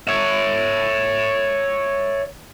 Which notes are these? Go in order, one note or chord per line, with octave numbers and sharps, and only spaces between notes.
C#5 E5